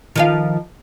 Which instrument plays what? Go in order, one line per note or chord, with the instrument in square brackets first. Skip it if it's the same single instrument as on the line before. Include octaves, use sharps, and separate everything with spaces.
[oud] D#3 F3 F5